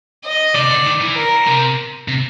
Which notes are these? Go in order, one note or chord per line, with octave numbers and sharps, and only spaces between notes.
D#5
C3 D5
D3
D#3
E3
A#4
C3
C3